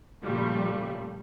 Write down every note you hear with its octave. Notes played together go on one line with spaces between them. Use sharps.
A#2 C#3 F3 G3 A3